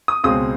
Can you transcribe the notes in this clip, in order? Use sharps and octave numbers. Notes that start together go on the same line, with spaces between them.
D#6
C#2 B2 G#3 C4 D#6